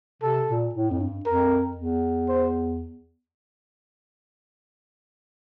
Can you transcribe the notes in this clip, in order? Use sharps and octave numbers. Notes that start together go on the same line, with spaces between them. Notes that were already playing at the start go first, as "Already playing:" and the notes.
C3 A4
A#2
A2
F2
G2
F2 A#4
E2
C5